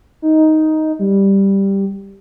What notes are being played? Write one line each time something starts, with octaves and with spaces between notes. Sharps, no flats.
D#4
G3